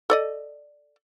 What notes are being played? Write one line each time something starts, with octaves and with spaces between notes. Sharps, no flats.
A4 D5 D#5